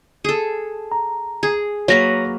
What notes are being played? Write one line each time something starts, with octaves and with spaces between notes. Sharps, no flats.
G#4 A4
A#5
G#4
F#3 A#3 B4 C#5 A#6